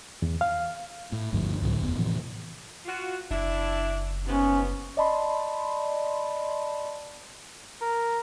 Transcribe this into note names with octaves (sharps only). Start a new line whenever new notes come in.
E2
F5
A2
G1 D2 G#2 F3
C#2 A2 D3 F#3
F#1 E2 B3
A2 C3 E3 F3
F4 F#4
F#1 D4 E4
D#2 C3 B3 C#4
D5 D#5 A5 B5 C6
A#4